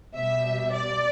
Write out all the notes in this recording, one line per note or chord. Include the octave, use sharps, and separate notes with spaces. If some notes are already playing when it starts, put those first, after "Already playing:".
B2 G3 E5
D5